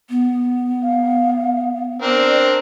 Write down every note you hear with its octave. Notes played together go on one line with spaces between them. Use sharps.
B3
F5
C4 D4 A#4 D5